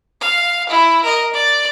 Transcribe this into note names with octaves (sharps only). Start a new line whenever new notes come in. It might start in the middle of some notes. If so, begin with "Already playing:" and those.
F5
E4
A#4 D#5
D5